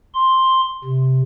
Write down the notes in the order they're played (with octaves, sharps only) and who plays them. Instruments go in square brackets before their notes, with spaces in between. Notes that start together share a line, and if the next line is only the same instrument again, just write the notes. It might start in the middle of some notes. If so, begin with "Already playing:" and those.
[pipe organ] C6
C3